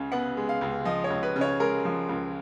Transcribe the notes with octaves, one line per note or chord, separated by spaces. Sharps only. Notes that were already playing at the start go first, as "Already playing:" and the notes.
Already playing: C#2 C#3 G#3
B3 F#5
G#3
F5
C#2
F3 D#5
C#5
C#2
B4
C#3
C#5
G#3 A#4
F3
C#2